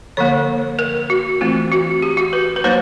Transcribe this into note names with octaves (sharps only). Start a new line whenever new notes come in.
D3 F3 A#3 C#5
A#4
F#4
E3 A3 C4 F4
F#4
G4
F#4
B4
B4
F#3 A#3 D#4 C5